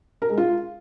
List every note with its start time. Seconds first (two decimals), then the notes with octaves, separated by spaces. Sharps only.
0.22 A#4
0.30 G#3
0.37 F4